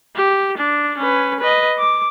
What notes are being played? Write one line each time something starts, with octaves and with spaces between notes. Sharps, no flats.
G4
D4
C#4 B4
B4 D#5
D6